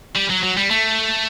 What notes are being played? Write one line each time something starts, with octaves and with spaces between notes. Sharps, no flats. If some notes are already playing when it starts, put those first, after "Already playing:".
G3
F#3
F#3
G3
A3